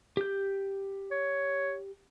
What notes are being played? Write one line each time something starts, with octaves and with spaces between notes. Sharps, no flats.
G4 G6
C#5